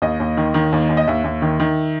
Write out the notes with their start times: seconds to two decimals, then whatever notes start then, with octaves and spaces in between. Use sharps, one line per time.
0.02 D#2 D#5
0.20 D#2
0.37 D#3
0.54 D#3
0.73 D#2
0.89 D#2
0.97 D#5
1.07 D#2 E5
1.24 D#2
1.42 D#3
1.60 D#3